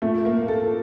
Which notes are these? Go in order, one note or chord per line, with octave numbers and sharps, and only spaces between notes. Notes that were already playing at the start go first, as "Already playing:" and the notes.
A#2 A3
A#3
A4